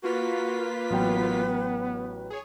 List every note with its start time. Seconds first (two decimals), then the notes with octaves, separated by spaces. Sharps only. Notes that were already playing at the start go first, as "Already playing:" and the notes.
0.04 A#3 F4 F#4 B4 B6
0.90 A1 F#3 B3 G5
2.30 G#4 C#5